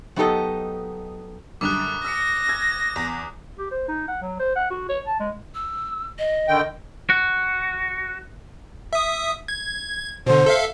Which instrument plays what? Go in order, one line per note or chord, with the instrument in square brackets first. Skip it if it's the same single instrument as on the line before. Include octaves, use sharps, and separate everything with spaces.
[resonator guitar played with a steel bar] F#3 B3 D#4 G4 A4 D#5
[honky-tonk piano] F#2 D3 G3 [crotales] D6 D#6 F#6
[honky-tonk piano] E6 B6 C#7 [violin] A#6
[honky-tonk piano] E6 G#6
E2
[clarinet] G4
C5
D#4
F#5
F#3
C5
F#5
F#4
C#5
A5
G#3
[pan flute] E6
D#5
[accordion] D3 D#3 G5
[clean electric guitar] F#4
[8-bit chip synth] E5 D#6
G#6
[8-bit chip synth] B2 D3 [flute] C5
[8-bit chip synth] A4 E5 F5